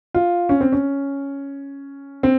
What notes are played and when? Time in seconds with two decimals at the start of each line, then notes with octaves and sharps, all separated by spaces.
0.14 F4
0.49 C#4
0.61 C4
0.72 C#4
2.23 C4